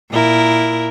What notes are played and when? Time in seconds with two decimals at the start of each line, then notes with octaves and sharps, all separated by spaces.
0.11 A#2 E4 A#4